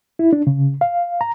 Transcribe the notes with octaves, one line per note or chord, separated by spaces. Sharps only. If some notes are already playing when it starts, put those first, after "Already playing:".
E4
D4
C#3
F5
A#5